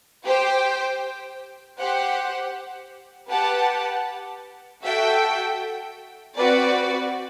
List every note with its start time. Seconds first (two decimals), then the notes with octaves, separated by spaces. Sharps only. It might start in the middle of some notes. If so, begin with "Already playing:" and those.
0.24 G4 C5 G5
1.77 G4 C5 F#5
3.30 G4 B4 F#5 A5
4.83 F#4 A4 E5 G5
6.36 C4 F#4 B4 D5